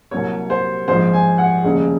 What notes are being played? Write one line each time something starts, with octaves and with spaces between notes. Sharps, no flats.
C2 C3 F#3 A#3 C#5
C5
A#1 G#2 F3 C4 C5
G#5
F#5
F1 D#2 C#3 G#3